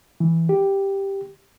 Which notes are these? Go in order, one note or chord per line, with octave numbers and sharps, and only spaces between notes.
E3
G4